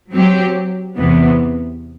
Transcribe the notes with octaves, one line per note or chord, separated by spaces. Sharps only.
F#3 C4 G4
E2 C3 E3 B3